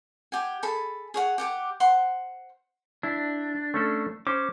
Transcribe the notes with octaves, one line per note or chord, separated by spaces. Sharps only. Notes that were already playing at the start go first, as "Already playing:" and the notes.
G4 F#5 G#5
G#4 A4 A5 B5
G#4 C#5 F#5
G4 F#5 G#5 D6
C5 F#5 C6
D4 E4
A3 C#4 A4
C#4 C5 D6